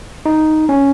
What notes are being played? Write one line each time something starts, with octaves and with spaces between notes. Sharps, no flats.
D#4
C#4